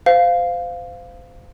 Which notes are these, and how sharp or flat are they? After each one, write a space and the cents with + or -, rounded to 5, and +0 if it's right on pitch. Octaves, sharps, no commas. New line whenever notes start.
C5 -30 F5 +0